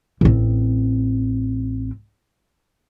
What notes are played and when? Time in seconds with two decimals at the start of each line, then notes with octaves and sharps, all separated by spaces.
0.21 A1 C4